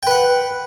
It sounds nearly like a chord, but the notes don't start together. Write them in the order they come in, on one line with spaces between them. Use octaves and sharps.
G5 B4 F#5